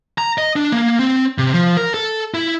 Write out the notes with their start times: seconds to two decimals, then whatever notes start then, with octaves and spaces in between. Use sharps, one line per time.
0.18 A#5
0.38 D#5
0.56 D4
0.72 A#3
0.99 C4
1.38 C3
1.54 F3
1.77 A#4
1.94 A4
2.34 E4